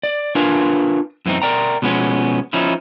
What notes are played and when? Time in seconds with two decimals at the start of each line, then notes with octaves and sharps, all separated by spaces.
0.03 D5
0.35 D4 F4 A#4 B4 F5 G#5
1.26 F#2 E3 B3 C4 D#4
1.42 A#4 D5 G5 A#5
1.82 B2 F3 G#3 B3 C#4
2.53 F3 C#4 D#4 E4